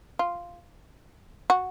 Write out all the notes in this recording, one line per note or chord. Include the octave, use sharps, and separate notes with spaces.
F4
F#4